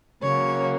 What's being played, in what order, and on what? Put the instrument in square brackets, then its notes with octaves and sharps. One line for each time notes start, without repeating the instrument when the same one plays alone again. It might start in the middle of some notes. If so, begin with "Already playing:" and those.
[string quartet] C#3 F#3 A#3 C#5